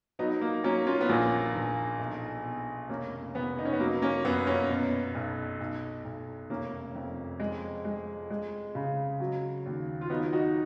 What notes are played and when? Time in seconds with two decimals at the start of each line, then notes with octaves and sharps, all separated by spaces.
0.19 F#3 B3 D#4
0.41 A#3
0.64 F#3 A#3 C#4
0.87 C#4 F4
1.01 B3
1.09 A#1 A#3
1.55 A#1
1.99 B1
2.44 B2
2.89 F1 A#3 C#4
3.35 F1 B3
3.59 D#4
3.65 C#4
3.73 B3
3.80 F#3 A#3
4.02 A#3 C#4
4.24 F#2 B3
4.47 A#3 C#4
4.69 B2
5.15 B1
5.60 B1
6.05 B1
6.50 F1 A#3 C#4
6.95 F2
7.40 G#3
7.85 G#3
8.30 G#3
8.75 C#3
9.20 F#3
9.66 D#2
10.01 F4
10.10 F#3 B3 D#4
10.33 D#4 F#4